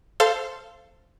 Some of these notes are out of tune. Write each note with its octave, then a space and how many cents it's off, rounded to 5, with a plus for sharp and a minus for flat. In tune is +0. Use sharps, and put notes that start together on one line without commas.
A4 +5 C5 +0 F5 -20